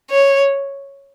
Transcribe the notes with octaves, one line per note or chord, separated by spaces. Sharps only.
C#5